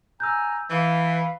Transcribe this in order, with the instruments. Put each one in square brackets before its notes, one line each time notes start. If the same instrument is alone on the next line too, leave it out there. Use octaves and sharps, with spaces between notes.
[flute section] G#5 A#5 [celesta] E6 F#6 G6
[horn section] E3 [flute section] B4 F5 B5